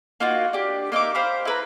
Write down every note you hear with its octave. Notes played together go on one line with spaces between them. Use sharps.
A#3 D#4 F4 F#4
D4 G4
A#3 D#4 E5 D6
C5 F5 G5 B5
E4 B4 A#5